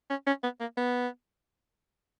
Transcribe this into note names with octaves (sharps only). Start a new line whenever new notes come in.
C#4
C#4
B3
A#3
B3